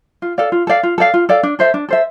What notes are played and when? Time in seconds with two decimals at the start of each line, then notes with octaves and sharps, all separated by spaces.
0.22 F4
0.38 A4 D5 F5
0.52 F4
0.67 A4 D5 F5
0.83 F4
0.98 A4 D5 F5
1.14 F4
1.29 A4 D5 F5
1.43 D4
1.59 A4 C5 E5
1.74 D4
1.89 A4 C5 E5